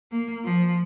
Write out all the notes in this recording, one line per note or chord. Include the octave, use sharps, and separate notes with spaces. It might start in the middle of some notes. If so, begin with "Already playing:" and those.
A#3
F3